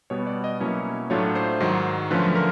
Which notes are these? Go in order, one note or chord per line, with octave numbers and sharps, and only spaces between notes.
B2 G3 B3 C#5
D5
D#5
B2 F#3 A#3 C#4 E4 C#5
A2 F#3 A3 D4 F4 C#5
C5
G#2 D#3 F#3
D3 F3 A3 C#4 F4 B4
A#4